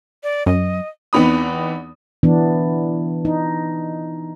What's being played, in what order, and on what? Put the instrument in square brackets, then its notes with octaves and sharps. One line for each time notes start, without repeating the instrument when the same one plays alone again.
[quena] D5
[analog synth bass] F#2 [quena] D#5
[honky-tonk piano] E2 B3 C4 D#4 B5 D#6
[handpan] E3 B3 D4
D#4